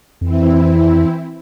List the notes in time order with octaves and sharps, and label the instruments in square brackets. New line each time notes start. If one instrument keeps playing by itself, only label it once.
[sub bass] F2 [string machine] E3 C4 E4